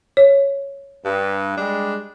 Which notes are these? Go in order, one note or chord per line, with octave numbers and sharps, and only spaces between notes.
C#5
G2
G3 G#3 D4